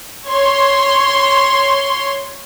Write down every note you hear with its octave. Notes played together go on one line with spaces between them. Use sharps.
C#5 C6